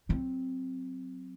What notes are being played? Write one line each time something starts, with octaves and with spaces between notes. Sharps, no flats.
F#3 C4